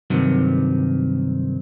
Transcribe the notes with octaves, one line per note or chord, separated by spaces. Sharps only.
G2 C3 D#3 F#3